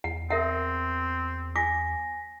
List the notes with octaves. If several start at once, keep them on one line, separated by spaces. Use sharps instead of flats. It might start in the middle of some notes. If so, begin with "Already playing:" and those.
E2 F#5
C4 A#4 E5 F#5
G#5 D6 A#6 B6